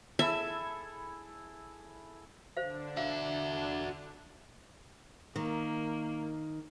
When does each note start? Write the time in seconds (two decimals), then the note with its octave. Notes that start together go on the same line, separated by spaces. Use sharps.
0.19 E4 G#4 A4 E5
2.57 D3 D4 C5 F5
2.97 F#4 E5 F5
5.36 D#3 A#3